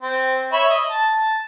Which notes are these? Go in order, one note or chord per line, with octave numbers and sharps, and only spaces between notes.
C4
C#5 E5 B5
D#5
A5